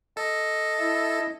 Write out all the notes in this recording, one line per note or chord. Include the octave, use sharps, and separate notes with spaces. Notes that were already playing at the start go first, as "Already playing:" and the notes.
A4 D#5
E4